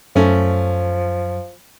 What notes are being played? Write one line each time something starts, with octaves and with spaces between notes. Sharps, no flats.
F#2 F3 A3 C#4